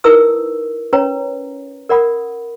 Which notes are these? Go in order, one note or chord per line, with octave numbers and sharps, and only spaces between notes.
D#4 E4 A#4 B4 D#6 E6
C#4 B4 C#5 A#5
A#4 D5 F#5 B5 D#6